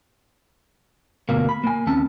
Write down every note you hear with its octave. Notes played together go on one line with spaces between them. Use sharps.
D2 B2 A#3
B5
A#3 G#5
D#2 C4 C#4 A5